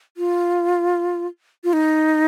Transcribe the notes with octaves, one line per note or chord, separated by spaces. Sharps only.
F4
F4
D#4